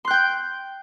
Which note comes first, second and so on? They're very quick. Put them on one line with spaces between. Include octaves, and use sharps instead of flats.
C6 F#6 G5 G6